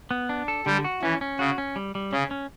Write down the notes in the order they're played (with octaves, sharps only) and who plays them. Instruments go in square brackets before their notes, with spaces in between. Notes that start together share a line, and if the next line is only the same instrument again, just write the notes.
[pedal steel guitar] B3
D4
A4
[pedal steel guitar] D3 [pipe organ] G3
[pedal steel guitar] F#4
[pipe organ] E3 [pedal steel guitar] C#4
[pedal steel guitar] C#4
[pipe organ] C#3 [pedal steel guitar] F#4
[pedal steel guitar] C#4
G3
G3
[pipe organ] C#3 [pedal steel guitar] C#4
[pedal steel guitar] C#4